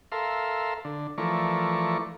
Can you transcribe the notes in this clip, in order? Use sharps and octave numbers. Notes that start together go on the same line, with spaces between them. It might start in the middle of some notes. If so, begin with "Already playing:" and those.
A4 A#4 E5 F5 C6
D3
E3 F3 A3 A#4 D5 C#6